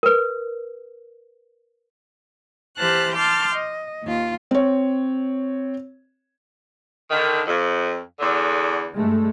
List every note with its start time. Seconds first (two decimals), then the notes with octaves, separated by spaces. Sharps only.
0.03 A#4 B4
2.78 E3 G4 C5 A5 F6 F#6
3.14 A5 C6 D6 F6 G6
3.54 D#5
4.03 D#2 F4
4.51 C4 C#5
7.11 D3 D#3
7.47 F2
8.20 E2 D3
8.94 G2 G#3 A3